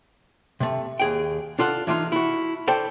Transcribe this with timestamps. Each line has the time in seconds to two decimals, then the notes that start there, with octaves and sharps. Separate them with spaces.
0.60 C3 A3
1.00 D#2 G#4 G5
1.59 D4 F4 A4 F#5
1.87 E3 D4 D#4 F4
2.12 E4 F#4
2.68 A4 C5 D5 G5 A5